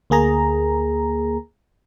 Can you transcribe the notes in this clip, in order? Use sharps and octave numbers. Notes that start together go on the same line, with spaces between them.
D2 A#3 G#4 A#5